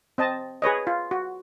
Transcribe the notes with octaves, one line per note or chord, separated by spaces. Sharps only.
C4 D#5 A5
G#4 B4 C#5 D#5
F4
F#4